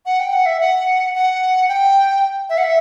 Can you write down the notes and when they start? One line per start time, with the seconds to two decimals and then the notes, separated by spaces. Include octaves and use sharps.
0.06 F#5
0.20 G5
0.33 F#5
0.46 E5
0.61 F#5
1.15 F#5
1.68 G5
2.49 E5
2.58 F#5
2.64 E5